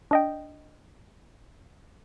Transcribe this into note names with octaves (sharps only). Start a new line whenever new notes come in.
D4 D#5 G5